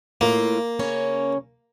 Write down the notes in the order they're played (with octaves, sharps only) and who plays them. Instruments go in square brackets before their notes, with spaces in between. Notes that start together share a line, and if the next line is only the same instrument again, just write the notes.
[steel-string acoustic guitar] A2 F4 [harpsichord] A#3
[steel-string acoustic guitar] C#3 C#4 C#5